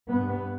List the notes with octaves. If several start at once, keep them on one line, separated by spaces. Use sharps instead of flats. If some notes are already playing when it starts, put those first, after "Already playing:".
G2 B3